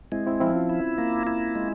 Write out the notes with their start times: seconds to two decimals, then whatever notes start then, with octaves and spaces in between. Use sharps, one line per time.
0.12 G#3 C4 E4
0.27 C4 E4
0.40 F3 C4 E4
0.55 C#4 F4
0.69 E4
0.98 A#3
1.27 E4
1.55 G#3